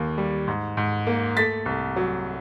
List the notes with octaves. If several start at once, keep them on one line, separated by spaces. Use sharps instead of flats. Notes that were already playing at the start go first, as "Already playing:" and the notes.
Already playing: D#2 A#3
G3
G#2
G#2
A#3
A3 A6 B6
C2
F#3